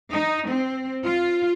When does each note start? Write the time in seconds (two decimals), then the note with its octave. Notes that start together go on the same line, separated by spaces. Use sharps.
0.11 D#4
0.47 C4
1.03 F4